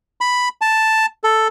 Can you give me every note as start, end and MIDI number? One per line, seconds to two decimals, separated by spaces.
0.21 0.49 83
0.61 1.06 81
1.24 1.48 69